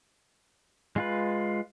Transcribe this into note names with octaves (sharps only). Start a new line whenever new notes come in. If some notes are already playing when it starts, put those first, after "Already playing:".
G#3 F4 B4